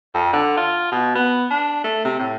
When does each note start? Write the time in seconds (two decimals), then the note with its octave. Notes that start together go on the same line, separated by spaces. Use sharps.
0.15 F2
0.33 D3
0.57 F4
0.92 B2
1.16 B3
1.51 D4
1.85 A3
2.05 C3
2.19 A2